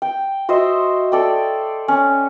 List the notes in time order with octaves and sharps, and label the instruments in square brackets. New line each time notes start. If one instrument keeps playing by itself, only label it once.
[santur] G5
F#4 C5 D#5 E5
A4 D5 G5
C#4